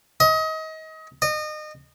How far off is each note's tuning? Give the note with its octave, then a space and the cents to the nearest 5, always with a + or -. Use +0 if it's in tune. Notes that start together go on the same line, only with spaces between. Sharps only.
D#5 +30
D#5 -30